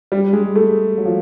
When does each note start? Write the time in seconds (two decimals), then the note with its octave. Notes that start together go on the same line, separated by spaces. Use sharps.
0.12 G3
0.33 G#3
0.55 A3
0.98 F#3
1.06 F3